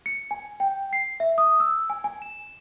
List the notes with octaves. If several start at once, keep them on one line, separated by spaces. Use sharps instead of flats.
C#7
G#5
G5
C7
E5
D#6
E6
G#5
G#5
E7